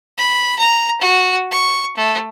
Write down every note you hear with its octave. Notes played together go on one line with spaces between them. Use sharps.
B5
A#5
F#4
C#6
A3